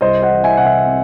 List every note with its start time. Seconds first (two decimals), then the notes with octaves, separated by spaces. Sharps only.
0.01 C2 C5 D#5
0.22 D#5 F#5
0.30 E3
0.44 E5 G#5
0.57 C3 F#5
0.65 E5 G#5
0.86 C4